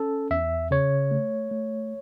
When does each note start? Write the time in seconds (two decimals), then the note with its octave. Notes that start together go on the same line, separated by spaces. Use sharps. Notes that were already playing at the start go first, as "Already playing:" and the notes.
Already playing: C#4 A4
0.31 E2 E5
0.71 C#3 C#5
1.11 A3
1.51 A3